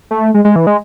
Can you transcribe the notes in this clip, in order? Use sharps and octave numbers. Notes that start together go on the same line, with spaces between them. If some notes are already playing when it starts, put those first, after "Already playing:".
A3
G#3
G#3
E3
G#3